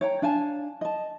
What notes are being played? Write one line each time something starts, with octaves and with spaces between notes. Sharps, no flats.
C#5 G5 A#5
D4 F5 G#5 A5
D#5 A5